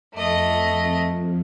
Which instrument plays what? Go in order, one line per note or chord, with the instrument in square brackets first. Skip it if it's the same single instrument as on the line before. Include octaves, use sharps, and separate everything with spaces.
[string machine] F2 [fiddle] A3 D#5